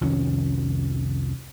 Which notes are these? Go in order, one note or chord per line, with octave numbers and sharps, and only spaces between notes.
C2 F2 D#3 C#4